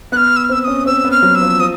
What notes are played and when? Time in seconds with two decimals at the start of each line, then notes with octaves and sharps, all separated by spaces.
0.12 B3 F#6
0.17 F6
0.36 E6
0.45 F6
0.49 C4 E6
0.61 E6
0.64 C#4 D#6
0.86 C4 E6
1.05 B3
1.11 F6
1.23 F#3
1.35 E6
1.41 F3
1.60 F3 D#6